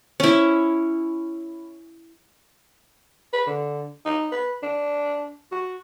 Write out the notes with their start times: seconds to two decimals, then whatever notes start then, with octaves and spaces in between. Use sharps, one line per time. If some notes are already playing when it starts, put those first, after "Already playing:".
0.20 C#4 E4
3.33 B4
3.47 D3
4.05 D#4
4.32 B4
4.63 D4
5.52 F#4